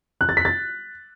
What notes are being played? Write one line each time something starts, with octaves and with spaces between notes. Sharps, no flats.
F#6
A6
B6
A6